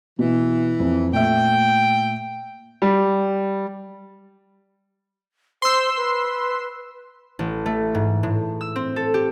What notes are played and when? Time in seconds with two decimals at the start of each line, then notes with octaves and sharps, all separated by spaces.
0.19 B2 E3
0.80 F2
1.12 A#2 A3 E5 G5
2.82 G3
5.62 C5 C6 E6
5.97 B4
7.39 A1
7.66 A3
7.95 G#2
8.23 A2
8.61 E6
8.76 C4
8.96 A4
9.14 G4